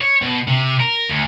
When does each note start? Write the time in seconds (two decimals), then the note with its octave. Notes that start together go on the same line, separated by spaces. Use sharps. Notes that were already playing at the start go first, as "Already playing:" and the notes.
0.01 C#5
0.22 B2
0.48 C3
0.80 A#4
1.09 D2